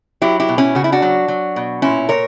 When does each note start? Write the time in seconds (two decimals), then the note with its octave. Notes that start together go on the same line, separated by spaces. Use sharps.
0.22 F#3 E4 G4
0.40 E4 G4
0.49 B2
0.58 C#4 E4
0.75 C#3 F#4
0.84 E4
0.92 D4 F#4
1.02 F#3
1.28 F#3
1.56 B2
1.82 A#2 C#4 E4
2.09 A#2 A#4 C#5